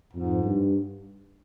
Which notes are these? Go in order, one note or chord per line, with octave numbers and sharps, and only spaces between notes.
F2 G#2
G2